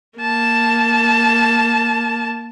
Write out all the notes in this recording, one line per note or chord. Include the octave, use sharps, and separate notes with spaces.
A#3 A5